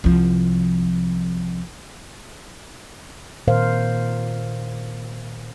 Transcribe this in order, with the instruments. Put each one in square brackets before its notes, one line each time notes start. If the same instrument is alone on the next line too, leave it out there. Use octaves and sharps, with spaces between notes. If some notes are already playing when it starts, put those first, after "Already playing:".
[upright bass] C2 F3
[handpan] A#2 D#3 A#4 C5 F5